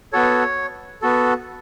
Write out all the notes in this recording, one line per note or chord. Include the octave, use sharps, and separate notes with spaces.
B3 F#4 A4 C#5
B3 F#4 A4